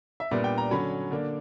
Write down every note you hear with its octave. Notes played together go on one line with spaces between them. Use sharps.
E5
A#2 G3 B3 D4 D5
G5
A#5
D3 F#3 C#4 B5
D3 A#3 D4